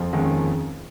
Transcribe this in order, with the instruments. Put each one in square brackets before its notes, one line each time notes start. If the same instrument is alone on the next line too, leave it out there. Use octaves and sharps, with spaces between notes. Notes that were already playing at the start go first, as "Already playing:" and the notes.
Already playing: [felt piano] F2 F3
[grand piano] D#2 D#3 G#3 C#4